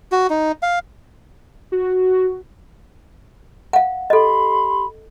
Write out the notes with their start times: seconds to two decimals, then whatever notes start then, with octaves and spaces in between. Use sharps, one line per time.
0.12 F#4
0.30 D#4
0.63 F5
1.72 F#4
3.73 F5 F#5
4.10 G4 A4 D#5 B5 C6